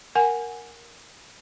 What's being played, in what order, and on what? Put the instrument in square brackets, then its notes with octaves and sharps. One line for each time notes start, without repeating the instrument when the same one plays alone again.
[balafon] A#4 F#5 G#5